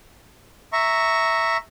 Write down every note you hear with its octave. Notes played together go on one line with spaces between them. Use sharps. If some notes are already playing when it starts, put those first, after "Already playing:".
E5 A#5 C#6